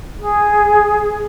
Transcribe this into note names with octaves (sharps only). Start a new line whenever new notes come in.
G#4